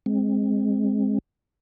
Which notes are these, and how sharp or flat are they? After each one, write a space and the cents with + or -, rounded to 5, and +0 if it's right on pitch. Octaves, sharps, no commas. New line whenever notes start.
G#3 +0 C4 +15